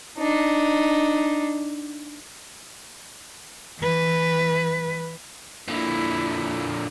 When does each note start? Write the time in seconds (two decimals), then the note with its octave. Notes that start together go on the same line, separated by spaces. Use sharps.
0.18 D4 D#4
3.79 E3 B4
5.68 A#2 D3 E4